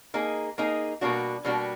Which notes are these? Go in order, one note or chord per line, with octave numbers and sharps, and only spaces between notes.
A#3 D#4 G#4
A#3 D#4 G#4
B2 G3 A#3 D4 F#4
B2 G3 A#3 D4 F#4